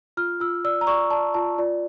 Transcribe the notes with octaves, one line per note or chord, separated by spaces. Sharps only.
F4 F6
F4 E6
D5 E6
A#5
D5 C#6
D5 A5
F4 A5
F4 D5